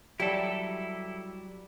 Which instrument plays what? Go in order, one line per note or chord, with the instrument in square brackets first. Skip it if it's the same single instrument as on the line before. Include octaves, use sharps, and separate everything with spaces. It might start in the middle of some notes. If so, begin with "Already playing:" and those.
[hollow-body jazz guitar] F#3 G3 G4 [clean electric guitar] E4 A4